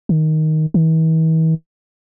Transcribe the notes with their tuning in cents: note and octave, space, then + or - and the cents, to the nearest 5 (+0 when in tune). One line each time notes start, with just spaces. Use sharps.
D#3 +5
E3 -45